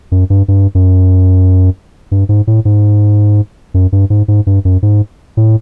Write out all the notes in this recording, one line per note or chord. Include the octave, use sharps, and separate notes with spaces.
F#2
G2
G2
F#2
G2
G#2
A2
G#2
F#2
G2
G#2
G#2
G2
F#2
G#2
A2